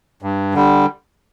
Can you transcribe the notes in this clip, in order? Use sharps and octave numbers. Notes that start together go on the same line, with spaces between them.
G2
D3 G3